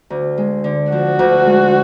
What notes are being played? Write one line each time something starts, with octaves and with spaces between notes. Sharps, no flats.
D2
G#3
D3
F3 F#4
D2
G#3